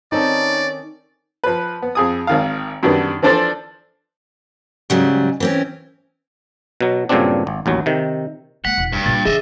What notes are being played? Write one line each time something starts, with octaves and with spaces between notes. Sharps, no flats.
D#3 C4 C#4 D#4 A4 D5
F3 B4
B3
F2 G#4 D#6
G#1 D#3 F5
F#2 D3 D#3 G3 B3
E3 F3 D4 A4 C5 D5
G#2 C#3 F#3 G3
E3 C4 C#4
B2 F#3
G2 A#2 C#3 F#3 C4 D4
G#1
A1 D#2 F#3
C3 D#3
G#3 A#3 F#5 B6
E1
G2
A#2 A#3 A6
E3 D4 G#4 D#5 E5